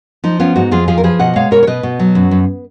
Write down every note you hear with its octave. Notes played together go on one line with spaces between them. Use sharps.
F3 D#4
B3 C#4 F4
G#2 D#4 F#4
F2 F4 G#4
F3 F4 G#4
A#4
F3 G#4 B4
B2 D#5 F#5
G#3 C#5 F5
B2 A#4 C#5
C#5
B2 B4 D#5
B2
F#3
F#2
F#2